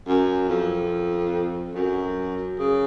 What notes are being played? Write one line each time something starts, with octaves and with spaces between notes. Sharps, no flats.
F#2
F2
F#2
C#3